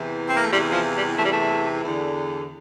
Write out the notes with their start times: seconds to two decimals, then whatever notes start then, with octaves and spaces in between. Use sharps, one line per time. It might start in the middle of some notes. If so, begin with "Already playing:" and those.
Already playing: E2 C3 E3
0.29 C4
0.36 A#3
0.43 A3
0.51 E2 C3 E3 G3
0.73 F3
0.95 G3
1.18 E2 C3 E3 A3
1.25 G3
1.33 A3
1.84 E2 D3